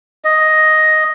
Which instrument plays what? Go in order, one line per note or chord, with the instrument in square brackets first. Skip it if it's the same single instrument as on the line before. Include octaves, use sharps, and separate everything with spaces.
[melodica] D#5